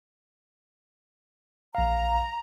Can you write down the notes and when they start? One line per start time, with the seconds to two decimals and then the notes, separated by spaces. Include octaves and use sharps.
1.75 A#1 F5 A#5